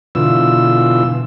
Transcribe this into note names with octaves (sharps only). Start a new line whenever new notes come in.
B2 D3 E3 F4 E6